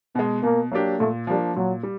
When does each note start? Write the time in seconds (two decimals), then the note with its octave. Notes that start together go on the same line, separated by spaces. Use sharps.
0.15 B2 G#3 B3
0.43 B2 A#3
0.71 F#3 A#3 D4 G4
0.99 A#2 A3
1.27 F3 G3 A#3 D4
1.55 A#2 F#3
1.83 G3